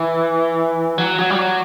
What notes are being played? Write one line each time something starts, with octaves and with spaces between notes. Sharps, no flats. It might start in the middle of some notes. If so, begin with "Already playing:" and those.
Already playing: E3
F#3
F#3
G3
F#3